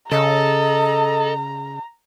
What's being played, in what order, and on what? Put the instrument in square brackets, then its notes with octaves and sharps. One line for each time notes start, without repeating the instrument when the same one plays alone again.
[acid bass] C#3 [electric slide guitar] A4 [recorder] D#5 [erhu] A#5